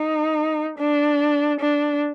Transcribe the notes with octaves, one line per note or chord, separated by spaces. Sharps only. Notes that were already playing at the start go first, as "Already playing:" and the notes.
Already playing: D#4
D4
D4